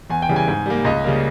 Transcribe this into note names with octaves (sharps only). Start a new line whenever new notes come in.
E2 G#5
G5
C#3 E3 G3
G#5
G#2
G3 A#3
C#2 D#5
C#3 G3 A#3